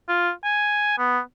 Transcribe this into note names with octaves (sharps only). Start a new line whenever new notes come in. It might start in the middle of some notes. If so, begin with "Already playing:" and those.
F4
G#5
B3